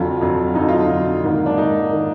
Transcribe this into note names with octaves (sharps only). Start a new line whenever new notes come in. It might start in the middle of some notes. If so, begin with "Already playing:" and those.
Already playing: F2 D3 F#3 F4
F2 D3 F#3
F2 D3 F#3 D#4
F4
D#4
F2 D3 F#3
G#2 D#3 A#3
D4
G#2 D#3 A#3 D#4
D#3 A#3